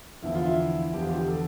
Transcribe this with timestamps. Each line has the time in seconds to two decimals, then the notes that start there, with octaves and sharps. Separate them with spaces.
0.22 E2 D3 F3 E4
0.35 F4
0.45 E4
0.93 E2 D3 F3 G4
1.02 F4
1.11 G4
1.28 A4